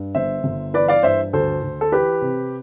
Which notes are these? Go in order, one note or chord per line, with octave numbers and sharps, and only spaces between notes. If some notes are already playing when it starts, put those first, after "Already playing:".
Already playing: G2
G1 C5 E5
G1
E3 B4 D5
D5 F5
G2 C5 E5
D2 A4 C5
D2
A4
E3 G4 B4
C3